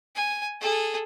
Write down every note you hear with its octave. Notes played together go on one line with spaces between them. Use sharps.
G#5
G#4 A4